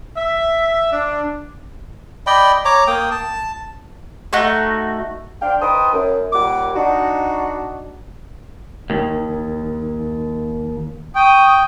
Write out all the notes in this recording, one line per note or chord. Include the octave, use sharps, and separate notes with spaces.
E5
D4
D5 D#5 G5 B5
C#5 A#5 D6
A#3 G5 D#6
A5
A3 D#4 F#4
D4 C5 F5 G5
D#4 B4 C5 G5 A5 D#6
F#2
D#2 A#2 G3 F#5 D6
D4 D#4 F#4
D#2 D#3
G5 C#6 D#6